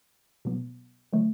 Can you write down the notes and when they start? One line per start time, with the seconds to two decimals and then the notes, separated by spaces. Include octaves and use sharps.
0.45 B2 F#3 B3
1.13 D3 F#3 A3